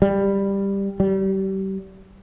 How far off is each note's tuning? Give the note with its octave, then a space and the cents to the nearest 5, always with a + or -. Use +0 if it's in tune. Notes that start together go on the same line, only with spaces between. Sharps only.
G3 +10
G3 -30